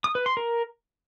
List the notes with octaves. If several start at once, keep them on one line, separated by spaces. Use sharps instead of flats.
D#6
B4
C6
A#4